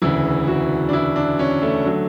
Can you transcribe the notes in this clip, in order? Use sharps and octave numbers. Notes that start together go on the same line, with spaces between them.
E1 D2 C#3 E3 E4
F#4
D4
E4
D4
C#4
A3
D3 F#3